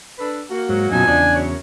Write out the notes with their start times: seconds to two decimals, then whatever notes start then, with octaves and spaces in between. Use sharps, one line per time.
0.18 D4 A4 B4
0.50 A#3 F#4
0.69 G#2 F#3
0.91 F#2 B2 F3 D#4 G#5
1.07 E2 C#3 D4
1.35 F#2 C#5